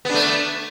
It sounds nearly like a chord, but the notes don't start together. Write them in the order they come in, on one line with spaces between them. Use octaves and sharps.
B3 D4 A3